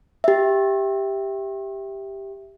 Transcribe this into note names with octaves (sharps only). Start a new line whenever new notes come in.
G4 E5